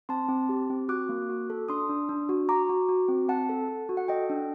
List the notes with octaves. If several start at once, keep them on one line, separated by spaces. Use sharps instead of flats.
C4 A5 C6
C4
G4
C4
F#4 D6 F#6
A#3
F#4
A4
D4 C6 D#6
D4
D4
F#4
F#4 A#5 D6
F#4
F#4
C4
C4 F#5 A5
A4
A4
F#4
F#5
A4 D#5 G5
D4